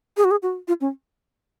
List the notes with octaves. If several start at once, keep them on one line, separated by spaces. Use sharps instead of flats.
G#4
F#4
G#4
F#4
F4
C#4